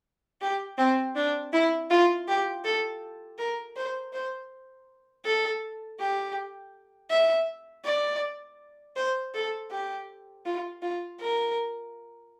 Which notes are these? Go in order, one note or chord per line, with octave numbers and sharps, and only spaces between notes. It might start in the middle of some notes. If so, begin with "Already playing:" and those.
G4
C4
D4
E4
F4
G4
A4
A#4
C5
C5
A4
G4
E5
D5
C5
A4
G4
F4
F4
A#4